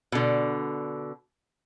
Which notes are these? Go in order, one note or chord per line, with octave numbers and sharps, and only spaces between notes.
B2 D3